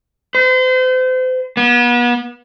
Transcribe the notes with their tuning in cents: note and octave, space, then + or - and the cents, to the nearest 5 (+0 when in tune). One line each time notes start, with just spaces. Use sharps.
C5 -35
B3 -35